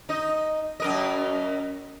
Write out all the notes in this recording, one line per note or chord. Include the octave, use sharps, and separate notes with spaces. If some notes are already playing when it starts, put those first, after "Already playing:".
D#4 D#5
F#2 A#4 D#5